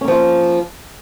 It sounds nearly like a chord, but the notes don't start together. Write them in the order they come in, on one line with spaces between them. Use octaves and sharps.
C#4 A#3 F3 F4